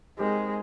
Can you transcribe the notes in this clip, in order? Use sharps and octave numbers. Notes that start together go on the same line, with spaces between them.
G#3 C4 D#4 G4 A#4